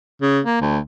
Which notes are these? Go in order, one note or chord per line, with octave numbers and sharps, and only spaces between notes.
C#3
A#3
D2